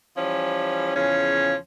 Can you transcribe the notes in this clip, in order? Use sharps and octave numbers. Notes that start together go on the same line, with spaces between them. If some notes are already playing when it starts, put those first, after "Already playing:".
E3 F3 G3 C#4
E2 C#3 F3 C#4